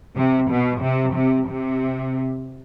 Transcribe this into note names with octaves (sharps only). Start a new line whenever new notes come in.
C3
B2
C3
C3
C3